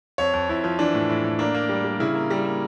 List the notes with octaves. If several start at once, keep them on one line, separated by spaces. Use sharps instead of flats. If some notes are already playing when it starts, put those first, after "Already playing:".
F2 C#5
F2
F2 E4
F3
E3 D4
A2
A2
A2
A#3 D4
A#3
G3
G3
C#3 E4
A#3
G3
A#3